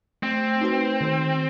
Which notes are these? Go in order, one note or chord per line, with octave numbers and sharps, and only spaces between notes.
A3 C4
D#4 F#4 B4
D#3